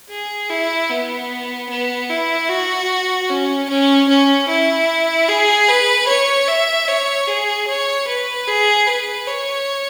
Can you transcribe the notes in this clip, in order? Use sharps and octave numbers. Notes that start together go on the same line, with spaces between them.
G#4
E4
B3
B3
E4
F#4
C#4
C#4
C#4
E4
G#4
B4
C#5
E5
C#5
G#4
C#5
B4
G#4
B4
C#5